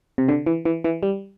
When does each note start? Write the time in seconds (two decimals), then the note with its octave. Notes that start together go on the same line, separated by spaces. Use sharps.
0.18 C3
0.28 D3
0.46 E3
0.65 E3
0.84 E3
1.03 G3